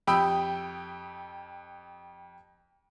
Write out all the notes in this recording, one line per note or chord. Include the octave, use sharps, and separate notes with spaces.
F2 G4 G5 B5 D#6 E6